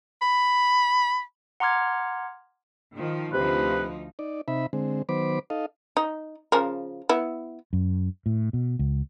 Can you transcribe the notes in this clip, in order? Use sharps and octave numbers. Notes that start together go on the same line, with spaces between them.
B5
F#5 A#5 C6 D6 F6 G#6
D#3 F3
D2 C3 F3 D#4 B4
D#4 D5
C3 D#4 E5 B5
D3 G#3 C4
D#3 F#3 B3 C5 B5 D6
D#4 A4 D#5 F5
D#4
C#3 F3 A#4
B3 E4
F#2
A2
B2
C#2